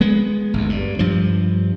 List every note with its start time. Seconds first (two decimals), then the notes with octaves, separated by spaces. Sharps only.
0.01 G#3 B3
0.54 G#1 D2
0.69 G2
0.99 G2 F3